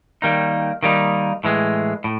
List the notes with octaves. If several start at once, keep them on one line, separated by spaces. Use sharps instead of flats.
D#3 G3 A#3 D#4
D#3 G3 A#3 D#4
A2 E3 G#3
A2